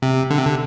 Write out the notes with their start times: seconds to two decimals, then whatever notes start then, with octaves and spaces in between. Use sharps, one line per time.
0.02 C3
0.30 D3
0.38 C3
0.45 D3